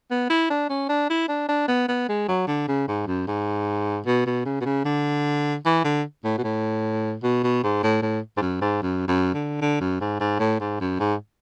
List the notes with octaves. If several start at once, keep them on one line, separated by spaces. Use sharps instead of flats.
B3
E4
D4
C#4
D4
E4
D4
D4
B3
B3
G#3
F#3
D3
C#3
G#2
F#2
G#2
B2
B2
C#3
B2
C#3
D3
E3
D3
A2
B2
A2
B2
B2
G#2
A2
A2
G#2
F#2
G#2
F#2
F#2
D3
D3
F#2
G#2
G#2
A2
G#2
F#2
G#2